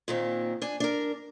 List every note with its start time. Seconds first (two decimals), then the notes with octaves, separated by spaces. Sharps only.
0.08 A#2 D#3 C4
0.62 D4 G#5
0.80 D4 A#4